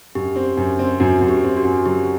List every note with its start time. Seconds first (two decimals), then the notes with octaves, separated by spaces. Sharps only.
0.15 F#2 G4
0.36 C4
0.57 F#2
0.79 C4
1.00 F#2 F#4
1.21 F#2
1.28 G4
1.43 C4
1.57 F#4
1.64 F#2
1.86 F#3 G4